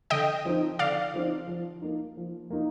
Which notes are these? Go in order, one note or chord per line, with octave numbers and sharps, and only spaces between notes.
D3 D#5 G5
F3 C4 D#4
D3 D5 F5
F3 C4 D#4
F3
A#3 D#4
F3
A#3 D#4